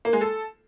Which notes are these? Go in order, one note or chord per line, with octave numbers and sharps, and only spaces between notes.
A#3
G#3
A4